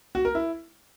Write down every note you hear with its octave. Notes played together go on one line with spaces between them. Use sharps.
F#4
A#4
E4